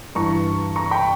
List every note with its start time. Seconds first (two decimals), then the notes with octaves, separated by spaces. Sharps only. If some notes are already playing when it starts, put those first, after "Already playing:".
0.15 G2 E3 A#5 C#6
0.76 A#5 C#6
0.91 G5 B5